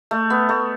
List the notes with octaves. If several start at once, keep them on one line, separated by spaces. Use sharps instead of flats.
A3
B3
A3